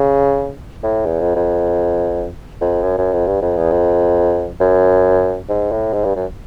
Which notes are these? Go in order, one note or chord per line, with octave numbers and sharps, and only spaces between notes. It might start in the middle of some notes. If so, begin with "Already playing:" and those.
Already playing: C#3
A2
E2
F2
F2
F2
F#2
F#2
F2
G2
F2
E2
F2
F#2
G#2
A2
G#2
G2
F#2